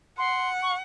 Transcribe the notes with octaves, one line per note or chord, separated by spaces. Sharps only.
F#5 C6
C#6